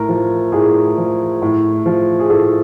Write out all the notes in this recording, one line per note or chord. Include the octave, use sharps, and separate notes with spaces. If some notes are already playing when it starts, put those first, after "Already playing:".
Already playing: A2 A#4
F3
A2 G#4
F3
A2
F3
G#4
A2 A4